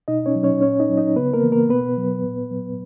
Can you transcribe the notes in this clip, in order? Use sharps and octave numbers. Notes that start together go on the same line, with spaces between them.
B2 D#4 D#5
C#4 C#5
F#3
C#4 C#5
A#2 C#4 C#5
D#4 D#5
F#3
D#4 D#5
C#3 B3 B4
A#3 A#4
E3
A#3 A#4
B2 B3 B4
F#3
A#2
F#3